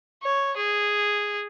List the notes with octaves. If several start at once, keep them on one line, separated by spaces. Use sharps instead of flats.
C#5
G#4